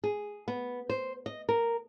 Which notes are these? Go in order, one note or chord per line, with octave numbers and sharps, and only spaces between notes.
G#4
B3
C5
D#5
A#4